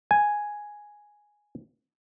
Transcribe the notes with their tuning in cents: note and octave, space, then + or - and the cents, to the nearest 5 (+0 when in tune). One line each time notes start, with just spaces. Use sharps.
G#5 +0